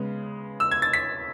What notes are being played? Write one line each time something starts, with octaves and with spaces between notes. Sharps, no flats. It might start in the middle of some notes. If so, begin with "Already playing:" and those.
Already playing: C#3 G#3 B3
E6
G#6
A6
B6